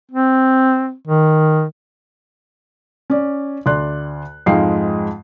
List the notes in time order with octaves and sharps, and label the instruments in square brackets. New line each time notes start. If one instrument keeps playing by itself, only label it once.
[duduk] C4
D#3
[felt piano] C#4 D5
D2 D5 C6 F#6
F2 G#2 G#3 F5 G5 C7